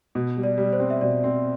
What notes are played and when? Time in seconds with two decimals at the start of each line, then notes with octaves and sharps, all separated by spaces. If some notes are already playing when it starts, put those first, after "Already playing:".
0.15 B2
0.37 G3
0.43 D5
0.58 G3
0.73 C5
0.80 C4
0.90 E5
1.01 B2 D5
1.24 C4